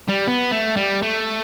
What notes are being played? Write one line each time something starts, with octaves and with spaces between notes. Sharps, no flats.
G3
B3
A3
G3
A3